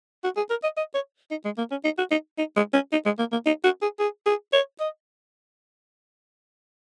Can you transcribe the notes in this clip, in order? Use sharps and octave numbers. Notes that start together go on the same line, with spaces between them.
F#4
G#4
A#4
D#5
D#5
C#5
D#4
G#3
A#3
C#4
D#4
F#4
D#4
D#4
G#3
C#4
D#4
G#3
A#3
A#3
D#4
F#4
G#4
G#4
G#4
C#5
D#5